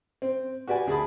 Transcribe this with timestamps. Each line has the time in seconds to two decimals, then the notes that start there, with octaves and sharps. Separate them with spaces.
0.22 C4
0.67 F#4 G4 B4 D5 G#5
0.87 D2 G#4 G#5 A5 B5